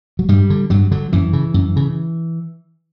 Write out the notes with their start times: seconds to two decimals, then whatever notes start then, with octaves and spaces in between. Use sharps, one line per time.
0.19 F#3
0.29 G2 G3
0.50 D3
0.70 G2 F#3
0.91 D3 F#3
1.13 F#2 E3
1.33 C#3
1.54 F#2
1.76 C#3